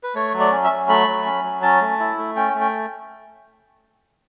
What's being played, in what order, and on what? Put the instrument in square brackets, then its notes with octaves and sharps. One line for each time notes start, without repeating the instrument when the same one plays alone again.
[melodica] B4
A3 C#5
F#3
D5
C#4
E5
F#3
A3 B5
F#3
C#4
F#3
C#4 A5
A3
E4
A3
C#4 G5
A3
G5